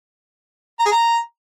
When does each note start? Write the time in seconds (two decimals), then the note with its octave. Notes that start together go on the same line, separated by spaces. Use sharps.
0.80 A#5
0.86 G#4
0.92 A#5